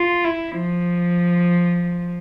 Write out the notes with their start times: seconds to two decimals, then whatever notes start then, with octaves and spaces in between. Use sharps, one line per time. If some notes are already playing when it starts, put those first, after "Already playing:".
Already playing: F4
0.25 E4
0.60 F3